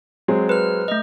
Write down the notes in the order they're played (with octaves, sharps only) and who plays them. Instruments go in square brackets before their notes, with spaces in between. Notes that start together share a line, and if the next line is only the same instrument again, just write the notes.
[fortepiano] F#3 G#3 C4
[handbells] B4 F6
A3 D#5